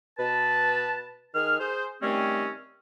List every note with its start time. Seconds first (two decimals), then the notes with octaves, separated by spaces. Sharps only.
0.18 B2 B4 A5
1.35 D#3 G#4 F6
1.60 G#4 C5
2.02 D#3 G3 A3 C4 C#4